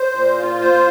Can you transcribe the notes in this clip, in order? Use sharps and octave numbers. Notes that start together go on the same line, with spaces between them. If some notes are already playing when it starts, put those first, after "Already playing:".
Already playing: C5
A#2
F4
C5